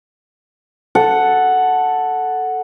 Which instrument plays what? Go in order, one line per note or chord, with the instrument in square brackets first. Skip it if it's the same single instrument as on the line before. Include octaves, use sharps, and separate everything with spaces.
[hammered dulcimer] A4 F#5